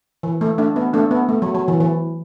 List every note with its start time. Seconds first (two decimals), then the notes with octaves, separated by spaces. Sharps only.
0.23 E3
0.41 A3
0.58 A3 D4
0.76 B3
0.93 A3 D4
1.11 B3
1.29 A3
1.42 F#3
1.55 F#3
1.68 E3
1.80 E3